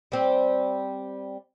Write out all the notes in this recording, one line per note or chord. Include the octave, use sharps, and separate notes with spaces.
G3 C4